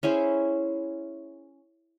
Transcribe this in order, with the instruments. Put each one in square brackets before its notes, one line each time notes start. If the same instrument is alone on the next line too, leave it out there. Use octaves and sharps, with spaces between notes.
[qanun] C#4 E4 G#4 C5